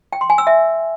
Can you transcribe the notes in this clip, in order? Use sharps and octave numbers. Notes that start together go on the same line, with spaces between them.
G5
C6
G#5
E6
E5